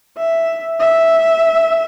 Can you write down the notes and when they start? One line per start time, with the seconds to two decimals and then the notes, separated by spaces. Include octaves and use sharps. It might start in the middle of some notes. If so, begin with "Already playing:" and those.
0.17 E5
0.80 E5